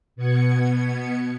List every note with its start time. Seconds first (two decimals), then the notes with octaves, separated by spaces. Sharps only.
0.16 B2 B3 G#6 C#7